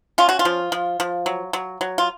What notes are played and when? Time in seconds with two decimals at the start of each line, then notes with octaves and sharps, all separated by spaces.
0.18 C#4 F4
0.29 F#4
0.39 F4
0.45 F3
0.72 F3
1.00 F3
1.26 F#3
1.53 F#3
1.81 F#3
1.98 F4